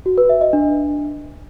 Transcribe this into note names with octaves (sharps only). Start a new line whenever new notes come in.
F#4
B4
E5
D#5
D4